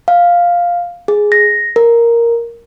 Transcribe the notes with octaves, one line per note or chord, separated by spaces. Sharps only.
F5
G#4
A#6
A#4